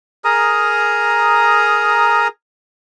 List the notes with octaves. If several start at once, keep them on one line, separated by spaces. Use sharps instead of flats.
G#4 A#4 A#5 D#6